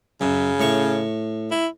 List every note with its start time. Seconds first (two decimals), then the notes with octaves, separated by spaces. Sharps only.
0.21 F#2 C#3
0.59 A2 C#6
1.51 E4